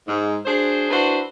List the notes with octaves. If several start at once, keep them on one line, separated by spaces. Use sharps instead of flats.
G#2
D4 F#4 G#4 C5
D4 E4 F#4 B4 C5